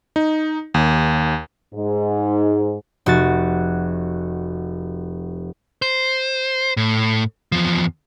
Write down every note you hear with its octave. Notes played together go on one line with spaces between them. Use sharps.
D#4
D#2
G#2
F1 F#4 A6
C5
A2
E2 F3